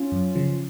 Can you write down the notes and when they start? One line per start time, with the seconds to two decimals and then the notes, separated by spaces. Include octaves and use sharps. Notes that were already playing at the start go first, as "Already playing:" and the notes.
Already playing: C#4 F4
0.12 F#2
0.35 C#3 F3